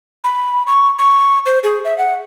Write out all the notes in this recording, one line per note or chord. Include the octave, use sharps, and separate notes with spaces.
B5
C#6
C#6
C5
G#4
E5
F#5